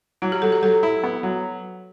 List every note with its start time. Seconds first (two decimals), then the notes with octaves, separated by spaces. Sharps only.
0.22 F#3 E4
0.32 G4
0.42 F#3 A4
0.52 G4
0.62 F#3 A4
0.83 E4
1.03 B3
1.23 F#3